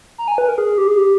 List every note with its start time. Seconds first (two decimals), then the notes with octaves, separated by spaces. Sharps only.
0.18 A#5
0.28 G#5
0.38 B4
0.48 A#4
0.58 G#4
0.78 G4
0.88 G#4
0.98 G4